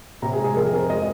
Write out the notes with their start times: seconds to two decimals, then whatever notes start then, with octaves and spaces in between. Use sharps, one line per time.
0.22 C3 A#5
0.33 G#4
0.39 G#3
0.44 G#4
0.56 F2 A#4
0.73 C4 A#4
0.89 G#3 D#5